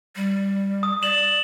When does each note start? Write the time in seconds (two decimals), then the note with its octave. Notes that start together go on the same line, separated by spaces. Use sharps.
0.16 G3
0.83 D#6
1.03 D5 E7 F#7